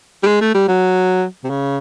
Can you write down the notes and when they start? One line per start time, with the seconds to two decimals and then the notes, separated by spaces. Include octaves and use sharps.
0.23 G3
0.27 G#3
0.41 A3
0.54 G3
0.68 F#3
1.44 C3
1.50 C#3